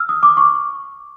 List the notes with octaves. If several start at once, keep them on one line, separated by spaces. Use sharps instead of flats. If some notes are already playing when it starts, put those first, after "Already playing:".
Already playing: E6 F6
D#6
D6
C#6